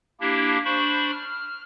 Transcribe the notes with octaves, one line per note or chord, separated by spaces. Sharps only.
A#3 D4 E4 G4
D4 C5 B5 C#6
F6